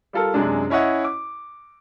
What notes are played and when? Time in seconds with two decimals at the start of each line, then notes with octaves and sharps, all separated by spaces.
0.13 G3 F4 A4 A#4
0.34 F#2 C3 G#3 D4
0.70 C#4 E4 C#5 D#5 F#5
1.04 D6